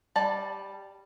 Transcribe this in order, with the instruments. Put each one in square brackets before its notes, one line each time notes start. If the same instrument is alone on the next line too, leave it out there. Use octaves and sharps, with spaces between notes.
[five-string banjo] G3 D5 A5